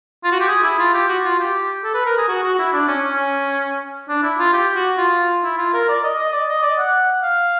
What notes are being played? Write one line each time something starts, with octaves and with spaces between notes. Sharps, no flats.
F4
F#4
G4
G#4
E4
F4
G4
F#4
F4
G4
A4
B4
A#4
G#4
F#4
F#4
E4
D4
C#4
C#4
D4
E4
F4
G4
F#4
F4
E4
F4
A#4
D5
D#5
D#5
D5
D#5
D5
F#5
F5